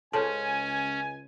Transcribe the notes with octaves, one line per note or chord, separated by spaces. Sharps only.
C#2 C#3 C#4 A4 C5 G#5 A5